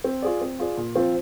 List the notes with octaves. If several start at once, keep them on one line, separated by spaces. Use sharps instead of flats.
C4
F4 G#4 D5
C4
F4 G#4 D5
A#2
F3 C4 F4 C5